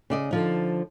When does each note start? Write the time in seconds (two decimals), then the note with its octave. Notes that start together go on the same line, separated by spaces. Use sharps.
0.10 C#3 D5 D#5
0.31 D3 F3 D#4